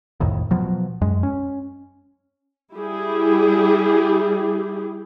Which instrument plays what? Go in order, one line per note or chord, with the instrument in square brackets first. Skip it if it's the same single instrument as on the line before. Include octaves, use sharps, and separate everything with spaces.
[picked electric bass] C2 F2 A2 D#3
B2 F3 F#3
F#2 G#3
C#4
[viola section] G3 E4 G4 G#4